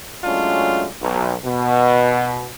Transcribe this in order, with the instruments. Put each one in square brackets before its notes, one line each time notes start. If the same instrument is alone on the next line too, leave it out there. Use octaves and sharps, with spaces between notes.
[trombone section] F#3 G#3 A3 C#4 D4 F4
B1
B2